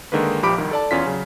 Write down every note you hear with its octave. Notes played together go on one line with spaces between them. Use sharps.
D3 D#3 G#3 A#3 B4
A#1 F3 G4 B5 D6 D7
C2 D#3
A4 D5 A5
E2 C#4 F4 B6
C#3 F#3